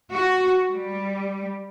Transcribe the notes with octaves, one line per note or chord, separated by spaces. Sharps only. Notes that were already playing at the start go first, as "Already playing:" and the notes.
F#4
G3